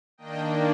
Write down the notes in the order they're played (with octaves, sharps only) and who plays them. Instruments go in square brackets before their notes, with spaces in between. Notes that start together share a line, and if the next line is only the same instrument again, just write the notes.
[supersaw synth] D#3 A#3 D4 D#5 G5